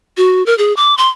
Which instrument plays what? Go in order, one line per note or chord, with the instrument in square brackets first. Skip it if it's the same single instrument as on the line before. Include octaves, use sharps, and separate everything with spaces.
[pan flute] F#4
A#4
G#4
D6
C6